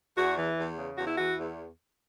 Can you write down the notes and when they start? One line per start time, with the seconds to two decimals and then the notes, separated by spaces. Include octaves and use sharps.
0.17 E2 F#4
0.37 E3
0.57 E2
0.77 C#3
0.97 E2 F#4
1.07 E4
1.17 E3 F#4
1.37 E2